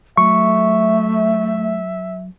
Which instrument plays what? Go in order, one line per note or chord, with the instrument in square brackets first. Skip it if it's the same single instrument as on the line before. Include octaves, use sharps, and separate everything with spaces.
[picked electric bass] F#3 [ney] A3 [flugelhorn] E5 [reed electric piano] C#6